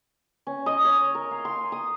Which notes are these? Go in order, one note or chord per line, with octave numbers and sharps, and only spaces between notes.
C#4
D#5
C#5
A#4
F5
C6
D#6